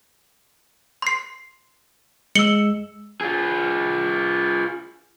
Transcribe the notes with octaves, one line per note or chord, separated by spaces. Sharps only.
C6 C7
G#3 E6 C#7 F#7 G7
F4 G#4